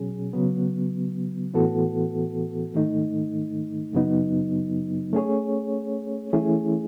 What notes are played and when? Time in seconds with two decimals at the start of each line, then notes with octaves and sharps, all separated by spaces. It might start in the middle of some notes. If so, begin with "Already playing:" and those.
Already playing: B2 F#3 C#4 G#4
0.33 C#3 F#3 B3
1.54 A2 E3 B3 F#4 A4
2.73 G#2 D#3 A3 D#4
3.93 F#2 C#3 F#3 B3 D#4
5.13 A3 C#4 G#4 C#5
6.33 E3 A3 C#4 E4 G#4